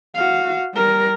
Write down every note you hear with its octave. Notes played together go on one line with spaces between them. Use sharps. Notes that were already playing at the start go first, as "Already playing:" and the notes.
F#4 F5
G3 A#4